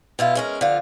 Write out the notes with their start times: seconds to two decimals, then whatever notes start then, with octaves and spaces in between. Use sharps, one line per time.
0.19 B2 E4 F4
0.35 G#3 C#4 A#4
0.61 D3 F3 F4